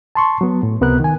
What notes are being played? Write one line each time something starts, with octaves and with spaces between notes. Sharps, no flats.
A5 C6 C#6
F#3 B3
A2
C#2 C3 B3 A#4 F#6
D#3 G#5